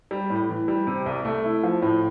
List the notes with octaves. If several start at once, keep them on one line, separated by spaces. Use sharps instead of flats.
G3
A2
E3
G3
C3
C2
A3
E4
F3
A2